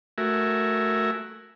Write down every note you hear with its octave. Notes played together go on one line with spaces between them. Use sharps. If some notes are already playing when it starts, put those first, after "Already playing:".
A3 F#4 A#4 E5 G#5